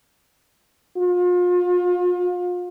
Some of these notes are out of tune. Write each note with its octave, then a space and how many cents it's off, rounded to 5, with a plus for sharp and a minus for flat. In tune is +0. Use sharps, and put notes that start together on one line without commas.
F4 +35